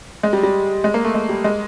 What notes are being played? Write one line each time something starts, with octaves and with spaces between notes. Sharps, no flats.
G#3
G3
G3
G#3
A#3
A3
G#3
G3
G#3